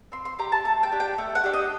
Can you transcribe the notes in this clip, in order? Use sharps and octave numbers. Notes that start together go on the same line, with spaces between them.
C4 C6
C6
G4 A#5
A5
A3 A5
G5
D4 G4
G5
A3
F#5
D4 G4
D#5